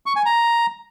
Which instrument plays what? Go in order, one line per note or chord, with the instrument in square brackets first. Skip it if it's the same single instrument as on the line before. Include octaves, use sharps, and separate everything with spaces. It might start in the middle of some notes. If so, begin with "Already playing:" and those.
[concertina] C#6
G#5
A#5